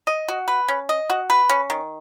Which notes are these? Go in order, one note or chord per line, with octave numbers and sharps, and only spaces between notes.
D#5
F#4
B4
C#4
D#5
F#4
B4
C#4
D#3